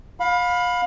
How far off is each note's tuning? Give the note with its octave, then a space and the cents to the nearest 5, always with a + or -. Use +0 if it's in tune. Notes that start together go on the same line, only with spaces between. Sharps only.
F5 +30 B5 +0